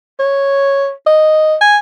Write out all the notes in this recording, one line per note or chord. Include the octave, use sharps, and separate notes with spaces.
C#5
D#5
G#5